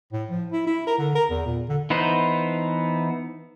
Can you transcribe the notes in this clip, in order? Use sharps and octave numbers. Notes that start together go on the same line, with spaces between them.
A2
F3
E4
E4
A#4
D3
A#4
E2
A#2
D3
E3 B3 D#4 B4 C5